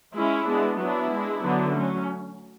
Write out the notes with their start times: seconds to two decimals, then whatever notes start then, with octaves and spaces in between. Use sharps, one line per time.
0.14 G#3 C#4 E4
0.46 G#3 B3 D4
0.79 F#3 B3 D4 E4
1.10 G#3 D4
1.42 D3 F#3 B3 D4
1.74 F#3 A3 C#4